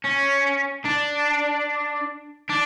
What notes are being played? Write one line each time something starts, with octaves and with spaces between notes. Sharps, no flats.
C#4
D4
D4